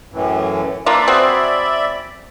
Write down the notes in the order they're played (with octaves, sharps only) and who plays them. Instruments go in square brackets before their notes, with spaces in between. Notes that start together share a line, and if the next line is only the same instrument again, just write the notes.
[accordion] F#2 A2 E3
[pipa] A#3 D4 F4 [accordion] D5 E5 B5
[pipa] C4 F#4 G#4